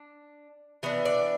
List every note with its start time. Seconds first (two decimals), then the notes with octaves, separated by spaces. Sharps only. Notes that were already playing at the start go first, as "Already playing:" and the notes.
Already playing: D4
0.83 E3 B3 D4
1.05 D5